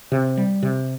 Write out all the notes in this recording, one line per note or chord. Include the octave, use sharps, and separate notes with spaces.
C3
G3
C3